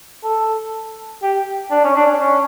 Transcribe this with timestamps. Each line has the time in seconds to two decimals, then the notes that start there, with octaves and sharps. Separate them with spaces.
0.24 A4
1.23 G4
1.71 D4
1.84 C#4
1.96 D4
2.20 C#4